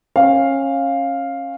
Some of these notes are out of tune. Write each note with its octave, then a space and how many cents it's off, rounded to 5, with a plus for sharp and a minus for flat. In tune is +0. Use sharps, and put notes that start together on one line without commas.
C#4 -25 F5 +0